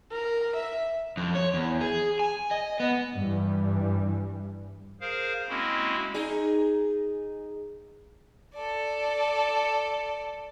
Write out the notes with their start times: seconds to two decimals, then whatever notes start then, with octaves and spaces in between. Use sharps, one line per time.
0.12 A#4
0.56 E5
1.17 F2
1.35 C#5
1.54 E2
1.81 G#4
2.19 G#5
2.51 D#5
2.80 B3
3.15 G2 E3 G3
5.01 G#4 A#4 C5 F5
5.48 G#3 A#3 C4 C#4 E4 F#4
6.14 D#4 G#4
8.54 A4 D5